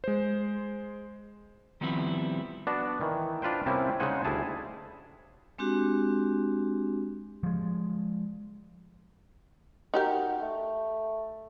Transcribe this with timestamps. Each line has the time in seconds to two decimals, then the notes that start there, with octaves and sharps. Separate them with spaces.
0.04 G#3 C5
1.81 D#3 F3 G3 B3 C4 E4
2.67 B3 D4 F#4 D5 A5
3.01 D#3 E3
3.42 D4 F4 B4 C5 G5
3.66 C3 G3 A#3 C4 C#4 E4
4.00 C#3 G#3 D#4 C5 F#5 G#5
4.25 D2 G3 E4 G#4 A5
5.58 G#3 C4 D4 F#4 G4
7.43 F3 G#3
9.94 D#4 F#4 G4 A#4
10.42 A3